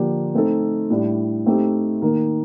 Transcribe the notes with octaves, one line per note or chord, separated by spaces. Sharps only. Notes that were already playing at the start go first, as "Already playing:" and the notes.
Already playing: D3 F3 A#3 D4 G4
A3 C4 D#4 A4
A2 G3 D4
A3 C4 D#4 G4
D#3 A#3 D#4 A#4